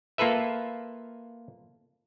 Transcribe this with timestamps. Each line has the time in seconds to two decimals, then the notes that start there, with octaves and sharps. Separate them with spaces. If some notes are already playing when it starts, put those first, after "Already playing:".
0.18 A#3 F4 A4 B4 E5